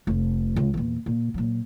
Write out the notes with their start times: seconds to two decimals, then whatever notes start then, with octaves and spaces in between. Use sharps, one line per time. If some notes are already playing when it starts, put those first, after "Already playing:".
0.07 F1
0.56 C#2
0.74 E2 A#2
1.06 A#2
1.34 A#2 F#3